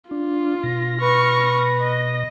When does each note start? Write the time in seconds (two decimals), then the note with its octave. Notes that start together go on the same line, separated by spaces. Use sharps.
0.11 D4 F4
0.64 B2 A#6
1.02 B4 C#6 F6
1.81 D#5